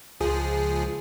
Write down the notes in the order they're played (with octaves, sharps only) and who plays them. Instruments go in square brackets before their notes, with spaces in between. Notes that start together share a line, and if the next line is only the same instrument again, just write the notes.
[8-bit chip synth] C#2 F3 G#4